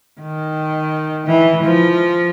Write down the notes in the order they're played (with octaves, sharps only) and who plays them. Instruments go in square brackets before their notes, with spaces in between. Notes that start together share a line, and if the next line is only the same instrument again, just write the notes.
[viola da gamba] D#3
E3
F3